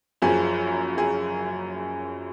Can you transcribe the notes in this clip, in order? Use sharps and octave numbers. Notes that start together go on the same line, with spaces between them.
F#1 F#2 F3 G#4
G#4